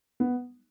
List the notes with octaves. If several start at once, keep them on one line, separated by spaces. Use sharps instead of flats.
B3